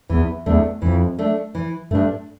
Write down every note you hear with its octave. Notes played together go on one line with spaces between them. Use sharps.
E2 E3
E2 A3 D4
F2 E3
A3 D4
E3
G2 A3 D4